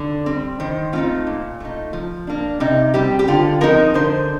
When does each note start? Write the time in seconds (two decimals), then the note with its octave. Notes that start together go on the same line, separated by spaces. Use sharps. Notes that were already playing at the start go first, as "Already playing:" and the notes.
Already playing: D3
0.26 G3 C4
0.60 D#3 C5
0.93 A3 C4 D#4 F4
1.27 A#2
1.60 A3 D#4
1.93 F3
2.27 A#3 D4
2.60 C3 D#4
2.94 G3 C4 G4
3.19 G4
3.28 D3 F4
3.61 F3 C4 D#4 A#4
3.94 D3 C5